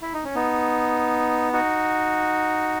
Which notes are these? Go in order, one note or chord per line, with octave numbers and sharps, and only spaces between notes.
E4
D#4
C#4
B3 D#4
D#4 F#4